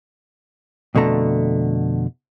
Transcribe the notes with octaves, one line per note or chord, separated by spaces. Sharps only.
F2 B2 D3 A3 A#5